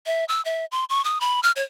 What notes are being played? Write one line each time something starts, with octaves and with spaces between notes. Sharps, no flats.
E5
E6
E5
C6
C#6
D#6
B5
F6
C#5